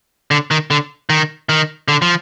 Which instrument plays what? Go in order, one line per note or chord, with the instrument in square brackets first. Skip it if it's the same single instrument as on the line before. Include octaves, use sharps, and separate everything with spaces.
[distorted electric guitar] D3
D#3
D3
D#3
D#3
D3
F3